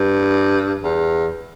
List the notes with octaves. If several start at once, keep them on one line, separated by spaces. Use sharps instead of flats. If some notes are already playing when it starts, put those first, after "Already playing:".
Already playing: G2
E2